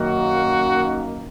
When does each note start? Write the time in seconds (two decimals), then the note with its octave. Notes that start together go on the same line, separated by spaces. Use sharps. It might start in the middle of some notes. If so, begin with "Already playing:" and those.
Already playing: F#2 D#3 A#3 F#4